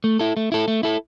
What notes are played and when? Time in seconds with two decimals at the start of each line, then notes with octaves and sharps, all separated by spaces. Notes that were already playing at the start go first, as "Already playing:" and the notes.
0.04 A3
0.19 E4 A4
0.37 A3
0.52 E4 A4
0.68 A3
0.83 E4 A4